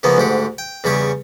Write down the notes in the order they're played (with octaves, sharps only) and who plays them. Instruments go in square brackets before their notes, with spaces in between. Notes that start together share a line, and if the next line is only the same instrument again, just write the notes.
[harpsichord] C#3 E3 F3 A#3 B3
D2 G#2 G4 F#5
G5
E2 C#3 G3 G4 C#5 C#6